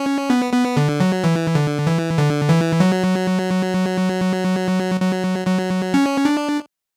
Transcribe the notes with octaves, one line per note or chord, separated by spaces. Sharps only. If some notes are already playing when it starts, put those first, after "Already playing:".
Already playing: C#4
B3
B3
D3
F#3
E3
D3
E3
D3
E3
F#3
F#3
F#3
C#4
D4